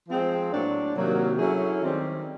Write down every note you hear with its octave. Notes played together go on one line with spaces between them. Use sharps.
F3 G#3 C4
A2 F#3 A#3 D4
C3 D#3 F#3 A#3
F#3 A3 C#4 E4 G#4
D#3 G3 C4